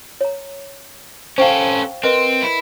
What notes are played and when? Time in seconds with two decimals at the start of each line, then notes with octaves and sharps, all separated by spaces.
0.21 C#5 A#5
1.38 C#4 A4 C5 F5 G5 C#6
2.04 C4 A#4 B4 D#5
2.42 E4